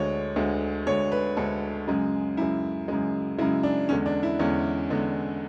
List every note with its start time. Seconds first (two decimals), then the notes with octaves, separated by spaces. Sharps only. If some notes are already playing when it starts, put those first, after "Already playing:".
Already playing: D2 D3 G#3 C#5
0.36 D2 D3 G#3
0.86 D2 D3 G#3 C#5
1.12 B4
1.36 D2 D3 G#3 A4
1.87 F#2 C#3 G#3
2.37 F#2 C#3 G#3 E4
2.88 F#2 C#3 G#3
3.38 F#2 C#3 G#3 E4
3.63 D4
3.89 E2 D3 G#3 C#4
4.06 D4
4.23 E4
4.39 E2 D3 G#3 C#4
4.90 E2 D3 G#3